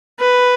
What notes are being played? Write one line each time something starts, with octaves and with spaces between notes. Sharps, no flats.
B4